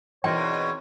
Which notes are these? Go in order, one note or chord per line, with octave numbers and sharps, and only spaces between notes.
E2 B2 C4 D#4 A#4 C#5 G5